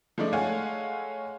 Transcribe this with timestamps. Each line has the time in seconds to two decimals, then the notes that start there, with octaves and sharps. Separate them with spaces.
0.18 F3 G#3 A3 D#4 D5
0.33 G#3 A3 C#5 F5 F#5 G#5